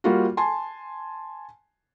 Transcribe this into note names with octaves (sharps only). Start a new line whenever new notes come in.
G3 A#3 F4 F#4
G#5 A5 C6